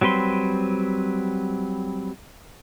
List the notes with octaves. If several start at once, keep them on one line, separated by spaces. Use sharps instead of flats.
F#3 G3 C4 B4 C6